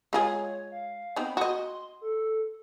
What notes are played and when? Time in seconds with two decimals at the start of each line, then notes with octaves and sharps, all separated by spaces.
0.13 G#3 F4 G#4 C#5
0.72 F5
1.16 B3 C4 D#4 B5
1.37 F#4 D#5 C6
2.01 A4